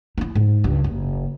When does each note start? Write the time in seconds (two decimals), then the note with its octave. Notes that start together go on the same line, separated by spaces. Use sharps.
0.18 D#4 E4
0.35 G#2
0.64 C#2 G2
0.84 F#1